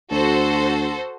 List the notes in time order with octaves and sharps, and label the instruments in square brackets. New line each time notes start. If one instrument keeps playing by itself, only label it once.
[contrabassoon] D2 [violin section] F#4 A4 C5